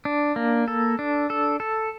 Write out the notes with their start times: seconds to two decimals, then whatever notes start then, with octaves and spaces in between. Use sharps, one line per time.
0.05 D4
0.36 A#3
0.68 A4
0.99 D4
1.30 A4
1.60 A4